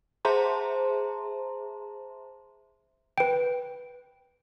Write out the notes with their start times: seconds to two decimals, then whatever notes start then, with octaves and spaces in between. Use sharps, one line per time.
0.25 G#4 C5 E5 A5 A#5 C6
3.18 B4 G5